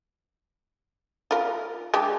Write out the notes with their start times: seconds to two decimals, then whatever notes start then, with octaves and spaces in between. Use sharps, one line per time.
1.31 F4 A#4
1.94 G#3 D4 G4